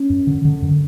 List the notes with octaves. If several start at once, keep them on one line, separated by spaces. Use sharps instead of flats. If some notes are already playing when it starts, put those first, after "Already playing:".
Already playing: C#4
F#2
D3
D3
F#2